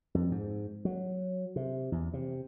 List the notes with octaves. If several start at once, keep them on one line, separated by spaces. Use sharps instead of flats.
F2
G#2
F#3
C3
E2
C3